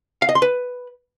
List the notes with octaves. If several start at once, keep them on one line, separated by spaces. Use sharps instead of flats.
F5
D#5
C6
B4